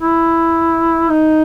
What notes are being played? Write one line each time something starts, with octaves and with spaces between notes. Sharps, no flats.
E4
D#4